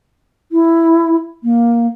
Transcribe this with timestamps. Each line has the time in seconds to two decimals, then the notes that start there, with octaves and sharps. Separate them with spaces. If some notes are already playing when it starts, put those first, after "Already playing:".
0.52 E4
1.44 A#3